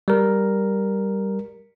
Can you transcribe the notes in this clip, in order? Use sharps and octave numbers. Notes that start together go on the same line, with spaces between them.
G3 A#4